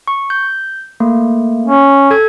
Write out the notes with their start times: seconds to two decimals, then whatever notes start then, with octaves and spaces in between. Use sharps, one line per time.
0.08 C#6
0.30 G6
1.00 A3 A#3
1.66 C#4
2.11 A4 G#6